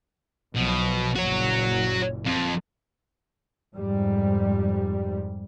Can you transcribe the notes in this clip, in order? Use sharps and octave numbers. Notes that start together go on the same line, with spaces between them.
B1 B2 F3 F#3
F#1 A#2 F#4 C#5
F2
F2 G#2 G3